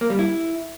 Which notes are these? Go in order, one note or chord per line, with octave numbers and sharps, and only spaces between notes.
A#3
G3
E4